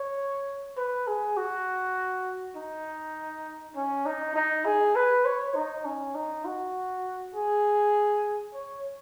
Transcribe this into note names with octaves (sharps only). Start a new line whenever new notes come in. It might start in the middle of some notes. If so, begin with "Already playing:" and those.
Already playing: C#5
B4
G#4
F#4
D#4
C#4
D#4
D#4
G#4
B4
C#5
D#4
C#4
D#4
F#4
G#4
C#5